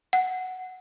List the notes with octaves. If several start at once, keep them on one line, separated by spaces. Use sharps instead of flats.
F#5